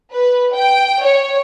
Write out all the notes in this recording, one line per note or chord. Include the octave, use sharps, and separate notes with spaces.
B4
G5
C#5